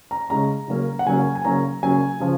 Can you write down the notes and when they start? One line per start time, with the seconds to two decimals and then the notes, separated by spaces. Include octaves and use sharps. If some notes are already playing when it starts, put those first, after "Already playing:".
0.11 A#5
0.30 C#3 G#3 C#4 A#5
0.68 C#3 F#3 A#3 C#4
0.99 F#5
1.06 C#3 F#3 A#3 C#4 G#5
1.35 G#5
1.45 C#3 F#3 A#3 C#4 A#5
1.83 C#3 F#3 A#3 C#4 G#5
2.20 C#3 F3